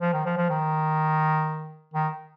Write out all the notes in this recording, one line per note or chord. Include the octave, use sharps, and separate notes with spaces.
F3
D#3
F3
F3
D#3
D#3